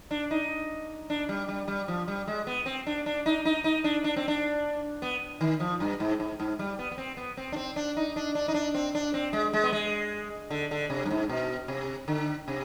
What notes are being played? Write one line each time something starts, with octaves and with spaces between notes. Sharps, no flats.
D4
D#4
D4
G3
G3
G3
F3
G3
G#3
B3
C4
D4
D4
D#4
D#4
D#4
D4
D4
C4
D4
B3
D#3
F3
G2
G#2
G#2
G#2
G3
B3
B3
C4
B3
C4
D4
C4
D4
D#4
D4
D4
D#4
D4
C4
D4
C4
G#3
G#3
B3
G#3
D3
D3
C3
G2
G#2
B2
C3
D3
C3